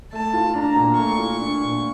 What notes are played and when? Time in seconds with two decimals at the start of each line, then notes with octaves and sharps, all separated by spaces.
0.13 A3 A5
0.34 F4
0.55 D4 A#5
0.76 A#2
0.97 A3 C#6
1.18 F4
1.40 D4
1.61 A#2